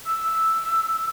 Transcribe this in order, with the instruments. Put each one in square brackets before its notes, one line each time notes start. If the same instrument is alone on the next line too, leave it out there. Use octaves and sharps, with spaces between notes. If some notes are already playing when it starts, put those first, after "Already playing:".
[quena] E6